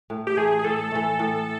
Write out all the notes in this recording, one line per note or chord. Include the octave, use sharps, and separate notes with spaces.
A2
G4
E3 A3 G#4
G#4
A2 A4
E3 A3
A2